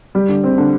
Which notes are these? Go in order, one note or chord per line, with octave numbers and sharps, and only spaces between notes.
G3
D3
C4
D3